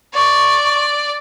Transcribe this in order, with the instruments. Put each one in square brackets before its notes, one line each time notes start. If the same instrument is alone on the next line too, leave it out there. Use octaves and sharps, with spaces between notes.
[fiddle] D5 [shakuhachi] C#6